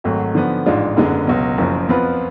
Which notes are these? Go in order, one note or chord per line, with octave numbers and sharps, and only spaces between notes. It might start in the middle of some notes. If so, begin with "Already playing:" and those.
G#1 G#2 F#3 A3
D3 F3 B3
A1 G#2 G#3 D4 F4
F#1 F#2 D3 G#3 B3
C#2 B2 F#3
F#1 F#2 F3
F2 F3 B3 F4 B4